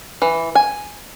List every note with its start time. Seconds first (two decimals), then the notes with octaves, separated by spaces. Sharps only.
0.22 E3
0.55 G#5